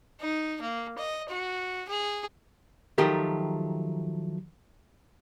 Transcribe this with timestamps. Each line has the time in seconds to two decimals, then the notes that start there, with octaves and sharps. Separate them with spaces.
0.21 D#4
0.61 A#3
0.98 D#5
1.29 F#4
1.89 G#4
2.98 D#3 F3 F#3 A3 G4 A#4